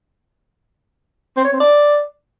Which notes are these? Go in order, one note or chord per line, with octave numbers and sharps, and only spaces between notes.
C4
C#5
C4
D5